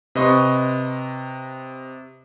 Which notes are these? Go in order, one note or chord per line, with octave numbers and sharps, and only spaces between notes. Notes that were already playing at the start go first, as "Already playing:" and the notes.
C3 B4 D#5 C6 C#6